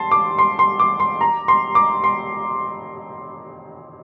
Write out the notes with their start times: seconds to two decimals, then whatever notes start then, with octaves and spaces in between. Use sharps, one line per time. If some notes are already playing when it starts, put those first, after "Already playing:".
Already playing: A5 C6
0.11 D6
0.38 C6
0.59 C6
0.79 D6
1.00 C6
1.21 A#5
1.48 C6
1.75 D6
2.04 C6